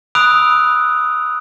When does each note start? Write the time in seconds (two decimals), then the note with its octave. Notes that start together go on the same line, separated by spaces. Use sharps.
0.15 B5 D#6 E6 F#6 D7 F7